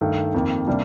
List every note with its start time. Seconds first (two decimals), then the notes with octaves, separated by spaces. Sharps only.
0.01 G2 D#3 A3
0.34 F2 D#3 A#3
0.67 C3 G3 A#3 D4